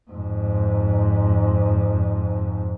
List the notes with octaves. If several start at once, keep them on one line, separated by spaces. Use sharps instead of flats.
F2 G#2